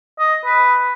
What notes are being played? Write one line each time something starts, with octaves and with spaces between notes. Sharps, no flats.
D#5
B4